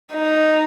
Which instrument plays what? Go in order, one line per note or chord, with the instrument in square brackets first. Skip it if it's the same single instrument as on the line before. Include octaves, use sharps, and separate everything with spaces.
[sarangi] D#4